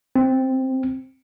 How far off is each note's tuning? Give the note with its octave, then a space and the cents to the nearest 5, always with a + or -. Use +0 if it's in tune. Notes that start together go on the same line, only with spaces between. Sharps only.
C4 +5